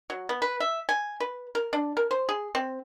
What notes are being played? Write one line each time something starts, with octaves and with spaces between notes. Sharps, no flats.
F#3
B3
B4
E5
G#5
B4
A#4
D4
A#4
C5
G#4
C4